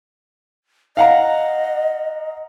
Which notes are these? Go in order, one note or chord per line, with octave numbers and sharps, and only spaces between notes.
D#5 F5 F#5 A#5